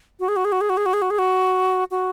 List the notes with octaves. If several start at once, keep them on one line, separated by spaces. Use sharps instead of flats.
F#4
G#4
F#4
G#4
F#4
G#4
F#4
G#4
F#4
G#4
F#4
G#4
F#4
F#4